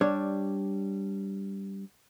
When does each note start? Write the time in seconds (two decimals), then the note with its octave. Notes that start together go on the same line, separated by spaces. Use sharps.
0.01 G3 D4 C#5